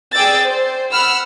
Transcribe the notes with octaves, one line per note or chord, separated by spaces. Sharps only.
G#4 D5 G5 E6 A6
C5
F#5 B5 E6 F6